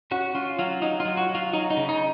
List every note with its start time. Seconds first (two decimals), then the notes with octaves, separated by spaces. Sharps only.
0.11 C#4 F#4
0.35 C#4 F4
0.59 F#3 F4
0.82 F#3 D#4
1.00 F4
1.05 F#3
1.17 F#4
1.29 F#3
1.35 F4
1.53 F#3 D#4
1.70 D#4
1.77 C#3
1.89 D#4